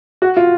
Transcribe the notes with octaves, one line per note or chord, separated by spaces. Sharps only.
F#4
F4